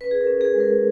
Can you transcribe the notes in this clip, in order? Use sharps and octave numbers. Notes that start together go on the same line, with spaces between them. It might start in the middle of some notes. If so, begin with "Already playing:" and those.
C#4 B4
G#4
A#4
C#4
G#4
G#3
A#4